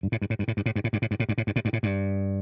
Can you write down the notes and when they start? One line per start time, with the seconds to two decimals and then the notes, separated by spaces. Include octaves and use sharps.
0.03 G2
0.12 A2
0.22 G2
0.30 A2
0.39 G2
0.48 A2
0.57 G2
0.66 A2
0.76 G2
0.84 A2
0.93 G2
1.02 A2
1.11 G2
1.20 A2
1.29 G2
1.38 A2
1.47 G2
1.56 A2
1.65 G2
1.73 A2
1.83 G2